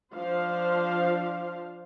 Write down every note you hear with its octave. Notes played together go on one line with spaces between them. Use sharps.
F3 D4 C5 F5